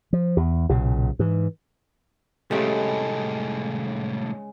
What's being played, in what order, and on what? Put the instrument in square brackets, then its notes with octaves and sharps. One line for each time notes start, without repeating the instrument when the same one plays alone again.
[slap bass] F3
E2
B1 A#2 C#3
G#2 E3
[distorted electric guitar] C2 A2 [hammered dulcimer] C#3 G#3 [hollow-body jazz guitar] A3 G4